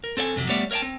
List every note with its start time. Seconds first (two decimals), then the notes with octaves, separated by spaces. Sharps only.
0.04 A#4
0.17 C4 A4 C#5 D#5 G#5
0.36 F2 C3 F3 F#3
0.48 G3 A3 B3 C#5 D5 E5
0.71 A#4 C#5 D#5 G5 A5
0.82 C4